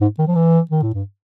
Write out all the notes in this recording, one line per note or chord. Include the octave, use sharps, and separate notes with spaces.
G#2
D#3
F3
E3
D#3
A2
G2